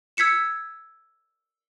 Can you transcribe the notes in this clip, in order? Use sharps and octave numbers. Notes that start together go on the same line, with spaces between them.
E6 G#6 B6 C#7 E7